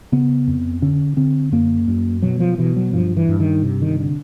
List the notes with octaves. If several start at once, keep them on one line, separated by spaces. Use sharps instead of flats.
C#3 B3
F2
D3 C#4
D3 C4
F#2 A#3
F#2
B2 F#3
F3
B2 E3
F#3
G2 F3
E3
G2
D#3
C3
D#3
D3